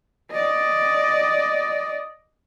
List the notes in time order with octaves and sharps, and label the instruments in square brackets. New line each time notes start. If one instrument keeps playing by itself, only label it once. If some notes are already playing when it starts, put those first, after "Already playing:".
[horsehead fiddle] D5 D#5